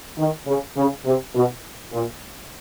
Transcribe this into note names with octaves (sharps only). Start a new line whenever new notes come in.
D#3
C#3
C#3
C3
B2
A#2